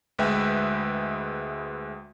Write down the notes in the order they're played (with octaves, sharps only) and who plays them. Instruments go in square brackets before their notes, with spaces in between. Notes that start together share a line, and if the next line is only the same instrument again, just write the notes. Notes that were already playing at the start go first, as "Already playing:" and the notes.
[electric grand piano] D2 G#3 B4 E5 G5